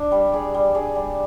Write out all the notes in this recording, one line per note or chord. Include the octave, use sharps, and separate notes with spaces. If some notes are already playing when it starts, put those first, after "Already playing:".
Already playing: D4
G3
D4 G#4
G3
D4 G#4
G3